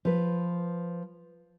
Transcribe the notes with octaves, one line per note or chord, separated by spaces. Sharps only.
F3 B4